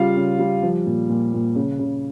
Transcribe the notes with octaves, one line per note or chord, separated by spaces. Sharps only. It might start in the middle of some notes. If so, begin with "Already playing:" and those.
Already playing: C#3 G3 F4 F5
C#3
G3
F3
A#2
A#2
A#2
C#3
C#3